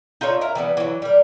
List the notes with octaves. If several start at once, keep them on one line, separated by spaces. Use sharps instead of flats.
D#4 F4 A4 C#5
A#4 E5 A#5
E3 G3 B3
E3 F#3
G3 A#4